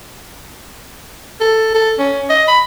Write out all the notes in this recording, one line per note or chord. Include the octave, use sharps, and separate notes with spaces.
A4
A4
C#4
D#5
B5